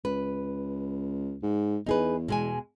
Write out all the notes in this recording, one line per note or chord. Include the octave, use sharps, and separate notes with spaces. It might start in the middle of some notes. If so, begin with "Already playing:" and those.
C#2 B4
G#2
E2 D#4 G#4 B4
B2 G#3 G#5